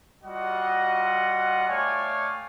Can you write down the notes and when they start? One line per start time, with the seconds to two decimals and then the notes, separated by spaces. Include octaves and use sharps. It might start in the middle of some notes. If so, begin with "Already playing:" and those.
0.24 G3 F4 F#4 D#5 F#5
1.68 A3 C#5 D5 F5 G5 G#5